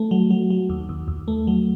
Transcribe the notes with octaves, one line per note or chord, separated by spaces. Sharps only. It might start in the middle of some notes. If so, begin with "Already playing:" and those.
Already playing: A3
F#3
F#3
F#3
D#2
D#2
D#2
A3
F#3